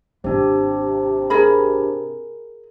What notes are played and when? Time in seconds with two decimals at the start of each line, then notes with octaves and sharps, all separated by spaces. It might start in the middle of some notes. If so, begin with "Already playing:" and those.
0.24 G#1 C3 D4 G4
1.30 G#4 A#4 B5